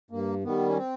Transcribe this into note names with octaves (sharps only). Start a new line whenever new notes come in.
G2 A#3
D#3 G3 B3
C#4
C4